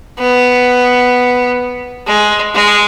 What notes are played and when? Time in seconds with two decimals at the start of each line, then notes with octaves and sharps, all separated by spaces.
0.18 B3
2.07 G#3
2.54 G#3